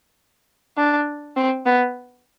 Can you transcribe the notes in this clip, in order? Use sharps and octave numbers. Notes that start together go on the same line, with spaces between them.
D4
C4
B3